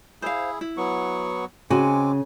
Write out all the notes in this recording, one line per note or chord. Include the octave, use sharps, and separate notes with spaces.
E4 G#4 C5 F5
E4
F#3 B3 C#6
C#3 G#3 C4 F#4 G#5 D6